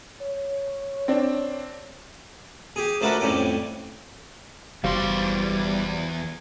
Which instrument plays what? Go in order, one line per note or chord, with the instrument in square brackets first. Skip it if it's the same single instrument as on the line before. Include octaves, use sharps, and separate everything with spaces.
[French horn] C#5
[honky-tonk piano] C4 D4
[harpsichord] G4 G#4
F3 A3 D4 F#4 A#4 B4
F2 A2 G3 C#4 D6
[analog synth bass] F#1 [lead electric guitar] E2 C6 [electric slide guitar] G3 [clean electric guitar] F#4 C5 F5